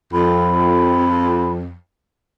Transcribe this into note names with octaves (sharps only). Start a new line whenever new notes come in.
F2 B5